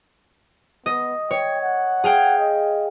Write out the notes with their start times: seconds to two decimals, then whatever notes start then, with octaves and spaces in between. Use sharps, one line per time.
0.86 B3 D#5
1.31 C#5 G5
1.61 F#5
2.04 G#4 F5 G5
2.38 D#5